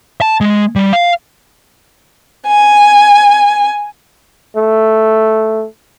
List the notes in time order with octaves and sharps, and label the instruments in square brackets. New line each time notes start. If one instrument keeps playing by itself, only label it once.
[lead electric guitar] A5
G#3
G3
F5
[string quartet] G#5
[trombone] A3